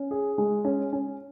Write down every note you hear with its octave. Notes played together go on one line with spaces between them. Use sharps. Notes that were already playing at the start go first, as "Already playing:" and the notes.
Already playing: C#4
G#4
G#3
C#4
C#4